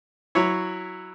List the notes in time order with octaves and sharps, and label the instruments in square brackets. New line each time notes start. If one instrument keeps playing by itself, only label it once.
[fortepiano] F#3 E4 C#5